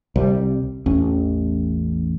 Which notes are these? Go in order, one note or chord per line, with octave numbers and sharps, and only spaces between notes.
C2 G3
A1 E2 C#4